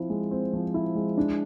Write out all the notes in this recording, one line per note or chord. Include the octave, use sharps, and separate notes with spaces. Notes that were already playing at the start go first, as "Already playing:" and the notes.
Already playing: F3 C4 E4
G#3
C4
F3
E4
G#3
D4